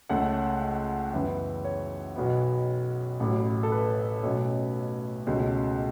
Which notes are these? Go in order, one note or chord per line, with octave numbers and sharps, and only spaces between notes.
C#2 C#3 A3 C#4 F#5
F#5
F#2 C#3 E3 B3 E5
C#5
B1 B2 B3
A1 A2 F#3
A4
B4
B1 B2 A3 C#4
C#2 B2 A3 C#4